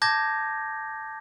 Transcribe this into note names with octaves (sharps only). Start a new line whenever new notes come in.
A5 D6 G6 G#6 A#6